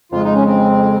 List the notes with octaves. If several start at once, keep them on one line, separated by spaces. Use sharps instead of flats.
F2 C#3 G#3 F4
D#4
C#4
C4